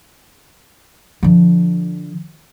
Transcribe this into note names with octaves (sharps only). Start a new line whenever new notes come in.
D3 F3